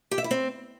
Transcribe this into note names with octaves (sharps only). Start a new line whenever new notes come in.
G4
E5
E4
C4